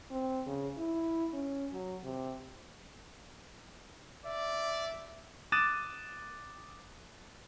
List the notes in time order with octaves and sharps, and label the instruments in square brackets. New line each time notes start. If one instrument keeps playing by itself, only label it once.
[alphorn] C4
C#3
E4
C#4
F#3
C3
[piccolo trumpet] D5 [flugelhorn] E5
[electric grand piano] D6 D#6 F#6 A6 D#7 E7